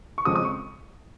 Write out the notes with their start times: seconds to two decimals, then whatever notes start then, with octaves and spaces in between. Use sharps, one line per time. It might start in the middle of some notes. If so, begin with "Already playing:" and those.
0.18 C#6
0.25 F2 C#3 F3 G#3 D#6
0.36 D#6
0.45 C#6